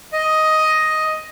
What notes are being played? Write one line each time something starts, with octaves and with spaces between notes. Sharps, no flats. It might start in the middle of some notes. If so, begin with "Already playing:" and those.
D#5